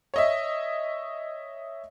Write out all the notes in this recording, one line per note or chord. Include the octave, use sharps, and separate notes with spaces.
C#5 D#5 E5